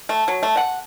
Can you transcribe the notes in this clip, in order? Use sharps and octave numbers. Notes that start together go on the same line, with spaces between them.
A3
F#3
A3
F#5